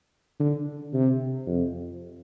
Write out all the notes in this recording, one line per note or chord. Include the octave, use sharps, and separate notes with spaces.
D3
C3
F2